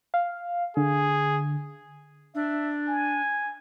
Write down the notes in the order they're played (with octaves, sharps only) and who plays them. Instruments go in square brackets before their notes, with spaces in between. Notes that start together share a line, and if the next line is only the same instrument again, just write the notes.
[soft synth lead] F5
[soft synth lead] D3 [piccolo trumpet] G#4
[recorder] D4 [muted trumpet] E5
[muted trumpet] G#5